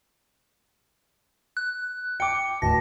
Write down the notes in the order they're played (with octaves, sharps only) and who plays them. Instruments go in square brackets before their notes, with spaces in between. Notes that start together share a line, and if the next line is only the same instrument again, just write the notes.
[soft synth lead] F#6
[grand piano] G5 D6 [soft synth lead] C#7
[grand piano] D1 [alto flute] A5 [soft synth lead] A#6